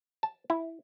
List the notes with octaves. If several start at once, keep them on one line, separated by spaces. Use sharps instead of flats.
A5
E4